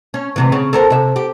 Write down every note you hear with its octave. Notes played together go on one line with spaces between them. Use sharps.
C#4
D2 C3 E3
C#3
A4 A#4 C5
C3 E5
G4